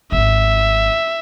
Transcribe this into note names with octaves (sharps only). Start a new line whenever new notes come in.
D#1 G#1 E5